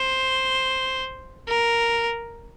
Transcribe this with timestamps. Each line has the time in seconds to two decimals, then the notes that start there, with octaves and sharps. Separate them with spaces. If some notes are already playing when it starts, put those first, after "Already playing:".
Already playing: C5
1.48 A#4